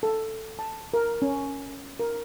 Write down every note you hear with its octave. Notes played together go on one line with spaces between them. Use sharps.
A4
A5
A#4
C#4
A#4